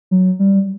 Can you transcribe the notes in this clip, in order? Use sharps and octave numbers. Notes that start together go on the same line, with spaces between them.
F#3
G3